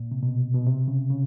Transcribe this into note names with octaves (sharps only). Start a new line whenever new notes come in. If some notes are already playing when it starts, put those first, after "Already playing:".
Already playing: A#2
C3
B2
B2
C3
C#3
C#3